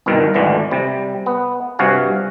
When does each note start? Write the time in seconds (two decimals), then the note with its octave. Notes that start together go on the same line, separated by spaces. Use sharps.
0.06 G1 C2 B2 D#3 A#4
0.34 G#1 D2 D3 E3
0.71 C3 G3
1.26 B3
1.79 G2 C3 F#4 F5 G#5